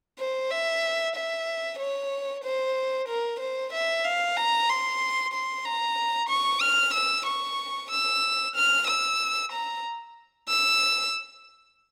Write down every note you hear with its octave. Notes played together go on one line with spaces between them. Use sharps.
C5
E5
E5
C#5
C5
A#4
C5
E5
F5
A#5
C6
C6
A#5
C#6
F6
E6
C#6
E6
F6
E6
A#5
E6